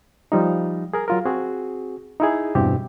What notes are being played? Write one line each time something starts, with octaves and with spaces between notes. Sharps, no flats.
F3 G3 D#4
G#4 A#4
F#3 F4 A#4
C4 F#4 G#4
D#4 E4 G#4
E2 G2 B2 E3 C4 G4